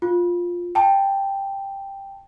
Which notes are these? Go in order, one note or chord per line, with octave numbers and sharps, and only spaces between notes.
F4
G5 A5